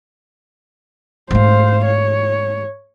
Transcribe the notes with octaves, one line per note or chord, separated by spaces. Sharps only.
G#2 A3 C5 F5
C#5